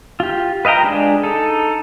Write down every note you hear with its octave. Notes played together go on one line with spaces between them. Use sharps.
F4 G4
B4 D#5 F5 G5 A#5
G#3 D4 G#4
D#4 A4